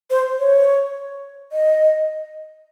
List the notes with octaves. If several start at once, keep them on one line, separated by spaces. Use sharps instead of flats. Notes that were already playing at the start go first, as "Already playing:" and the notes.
C5
C#5
D#5